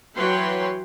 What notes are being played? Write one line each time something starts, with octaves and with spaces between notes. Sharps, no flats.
E3 F#3 B4 C#5 G5 C6